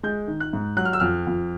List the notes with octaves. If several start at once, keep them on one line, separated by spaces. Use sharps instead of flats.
G#3 G6
D#3
F#6
G#2
F#3 F#6
F6
E6
F2 F6
F2